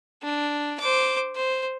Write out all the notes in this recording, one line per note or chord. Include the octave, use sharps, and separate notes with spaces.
D4
C5 D6
C5